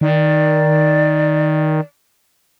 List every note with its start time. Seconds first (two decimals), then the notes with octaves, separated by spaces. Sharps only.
0.01 D#3 D5